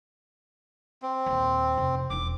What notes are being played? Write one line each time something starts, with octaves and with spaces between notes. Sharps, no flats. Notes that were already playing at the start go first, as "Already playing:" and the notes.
C4
D#2 A#2
F1
E1 D#4 D6